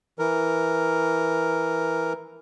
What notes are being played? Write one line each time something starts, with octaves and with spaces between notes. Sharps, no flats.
E3 A#4